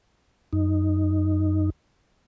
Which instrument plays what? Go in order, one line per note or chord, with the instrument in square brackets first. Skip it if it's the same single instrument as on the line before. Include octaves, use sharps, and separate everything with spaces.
[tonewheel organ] F#2 D#4